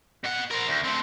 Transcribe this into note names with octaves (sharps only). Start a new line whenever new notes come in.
B2 F#5
A#4 C5
D2
A3 C4